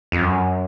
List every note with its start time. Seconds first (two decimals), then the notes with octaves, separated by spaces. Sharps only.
0.12 F2
0.22 F#2